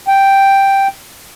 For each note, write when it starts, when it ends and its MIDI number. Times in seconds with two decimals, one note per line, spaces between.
0.08 0.88 79